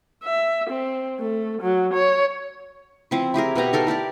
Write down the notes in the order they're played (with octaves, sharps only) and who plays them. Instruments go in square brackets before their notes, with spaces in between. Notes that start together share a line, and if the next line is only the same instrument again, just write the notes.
[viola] E5
C4
A3
F#3
C#5
[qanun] F3 C4 E4
E4 G4 G#4 A#4
B2 B3 G4 A#5
D#4 A4 A#4 C6
E4 G4 A#4 D5